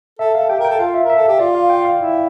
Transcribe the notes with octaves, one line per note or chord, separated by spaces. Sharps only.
A4 E5
A4 F5
G4 G5
A#4
G5
A4
F4 F5
E5
A#4
E5
A4
G4
F4 D5
F5
G5
F5
E4